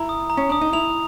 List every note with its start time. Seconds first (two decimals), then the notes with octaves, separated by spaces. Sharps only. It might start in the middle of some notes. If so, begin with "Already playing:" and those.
Already playing: E4 A#5
0.09 D#6
0.30 A#5
0.37 C#4
0.49 D4 D#6
0.61 D#4
0.73 E4 F7